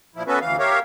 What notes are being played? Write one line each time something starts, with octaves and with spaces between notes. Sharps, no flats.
A#2 F3 E4
B3 C#4 F#4 A4 B4 E5
D2 E3 F5
G4 A#4 C#5 E5 F5